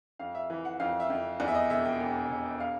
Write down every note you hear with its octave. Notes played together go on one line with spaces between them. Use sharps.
F2 F5
E5
E3
F#5
F2 F5
E5
F2
E2 D5
E5
D#5
E1 E5
G5
E1
E1
F5